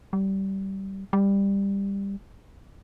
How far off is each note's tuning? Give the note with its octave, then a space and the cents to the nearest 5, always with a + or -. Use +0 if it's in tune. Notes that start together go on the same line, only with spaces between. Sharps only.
G3 -20
G3 +15